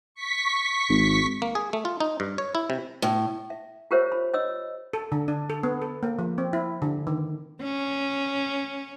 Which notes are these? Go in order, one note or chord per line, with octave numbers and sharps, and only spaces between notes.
C#6 B6
G#1
A#3
G#4
A3
F4
D#4
G2
C#5
E4
C3
A2
E5
F4 G4 A#4 C5 C#5 E5
B5
C#5 D#5 E6
A4
D3
D4
A4
B3
A4
A#3
F3
C4
E4
D3
D#3
C#4